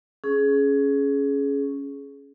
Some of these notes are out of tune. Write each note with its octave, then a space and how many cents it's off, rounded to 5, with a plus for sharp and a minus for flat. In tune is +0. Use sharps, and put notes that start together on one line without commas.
C#4 +5 G#4 +20